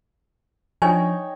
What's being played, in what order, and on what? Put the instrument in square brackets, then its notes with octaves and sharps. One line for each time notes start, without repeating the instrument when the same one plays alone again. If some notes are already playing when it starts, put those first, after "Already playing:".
[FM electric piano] F3 D4 [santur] D#4 C#5 G5 [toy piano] G#5